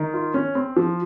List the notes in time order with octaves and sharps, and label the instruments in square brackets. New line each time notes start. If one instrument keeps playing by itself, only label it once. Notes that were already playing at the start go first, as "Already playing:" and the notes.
Already playing: [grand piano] D#3
F4
C#4
C4
F3